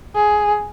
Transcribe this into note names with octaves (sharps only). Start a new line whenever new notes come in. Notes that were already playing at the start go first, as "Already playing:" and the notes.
G#4